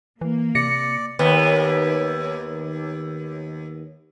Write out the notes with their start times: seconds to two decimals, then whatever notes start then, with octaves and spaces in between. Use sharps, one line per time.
0.21 E3 A#3
0.55 C3 D5 A#6 C#7
1.19 D#2 B3